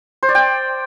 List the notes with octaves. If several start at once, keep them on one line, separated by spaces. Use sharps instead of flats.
C5
D5
G5